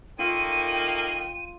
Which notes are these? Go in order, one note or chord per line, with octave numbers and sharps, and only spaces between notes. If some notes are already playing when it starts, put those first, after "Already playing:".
D#3 A3 A#3 F4 G5 D#7